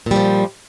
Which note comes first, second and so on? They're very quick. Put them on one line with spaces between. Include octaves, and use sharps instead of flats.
A#2 G3 F3